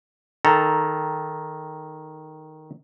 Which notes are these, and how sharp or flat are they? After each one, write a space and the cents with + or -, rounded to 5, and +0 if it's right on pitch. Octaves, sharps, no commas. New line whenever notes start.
D#3 +0 A4 -5 A#5 +0